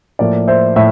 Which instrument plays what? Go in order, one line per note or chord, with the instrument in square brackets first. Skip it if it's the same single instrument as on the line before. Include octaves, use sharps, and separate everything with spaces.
[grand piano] A2 F3 A#3 D5
C5 E5
A2 E5